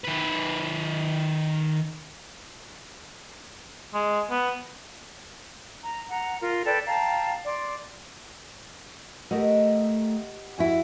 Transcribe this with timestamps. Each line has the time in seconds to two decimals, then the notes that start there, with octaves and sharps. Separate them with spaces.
0.05 D#3 B4
3.94 G#3
4.30 B3
5.84 A#5
6.10 F#5 A#5
6.42 F4 A#4
6.65 A4 B4 D5 G5
6.86 F5 G5 A5 A#5
7.45 D5 C6
9.31 A3 G4 A#4 D#5 F#5
10.58 F2 E4 F#4 G#5